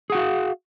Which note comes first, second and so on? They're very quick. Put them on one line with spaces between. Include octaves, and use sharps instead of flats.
G#4 F#5 F#4 F5